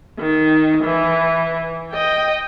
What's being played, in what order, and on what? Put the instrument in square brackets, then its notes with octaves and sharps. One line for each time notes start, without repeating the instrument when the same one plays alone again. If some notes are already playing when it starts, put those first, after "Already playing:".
[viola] D#3
E3
D#5 G5